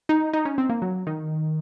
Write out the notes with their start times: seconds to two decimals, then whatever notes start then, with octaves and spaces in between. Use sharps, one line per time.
0.09 D#4
0.33 D#4
0.45 C#4
0.58 C4
0.69 A#3
0.82 F#3
1.07 D#3